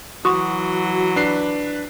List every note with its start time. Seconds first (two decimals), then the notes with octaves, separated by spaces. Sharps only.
0.25 E3 F#3 F#4 C6 C#6 D#6
1.16 D4 B4 C7